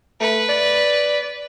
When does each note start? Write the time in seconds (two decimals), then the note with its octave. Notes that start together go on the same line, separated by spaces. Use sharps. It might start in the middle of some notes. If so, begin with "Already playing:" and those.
0.21 A3 B4
0.49 D5